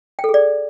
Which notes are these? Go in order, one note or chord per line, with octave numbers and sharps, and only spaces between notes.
G5
A4
G#4
D5